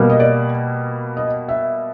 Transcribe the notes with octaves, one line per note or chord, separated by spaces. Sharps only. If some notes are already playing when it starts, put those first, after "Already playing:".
Already playing: B2 G3 A#3
D#5
D5
D#5
E5